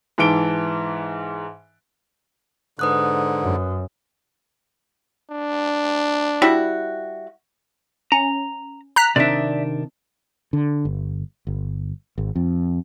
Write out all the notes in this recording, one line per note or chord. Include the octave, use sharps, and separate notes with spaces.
G#2 E3 E5 A5 D7 G7
G#2 D3 B4 D#6 F#6
F#2
D4
G3 E4 F#4
C#4 A#5
A#5 F#6 B6
C3 D#3 D4 D5 E5
D3
G1
G1
G#1
F2